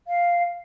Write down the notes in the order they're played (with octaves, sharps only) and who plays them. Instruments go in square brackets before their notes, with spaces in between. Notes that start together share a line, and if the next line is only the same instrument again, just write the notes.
[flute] F5